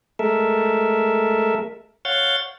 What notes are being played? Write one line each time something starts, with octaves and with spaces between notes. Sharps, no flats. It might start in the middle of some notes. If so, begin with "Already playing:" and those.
G#3 A3 A4 A#4 E5
C#5 F5 F#5 G6 A6